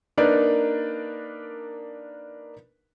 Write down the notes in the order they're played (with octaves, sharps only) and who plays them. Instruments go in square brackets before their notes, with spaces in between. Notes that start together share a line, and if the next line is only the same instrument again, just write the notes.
[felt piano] A#3 D4 D#4 A#4 B4 D5